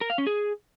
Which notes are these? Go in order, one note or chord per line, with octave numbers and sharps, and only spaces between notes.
A#4
F5
C#4
G#4